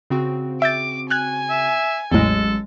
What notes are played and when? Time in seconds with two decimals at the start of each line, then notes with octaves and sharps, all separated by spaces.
0.10 C#3 C4 F#4
0.62 E5 D6 G6 A6
1.10 G#5 F6 F#6 G#6
1.50 E5
2.12 A1 E2 A2 F#3 G#3 A4